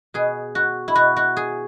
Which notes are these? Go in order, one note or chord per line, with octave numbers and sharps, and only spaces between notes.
B2 G#4
F#4
E4
B2 F#4
F#4
G#4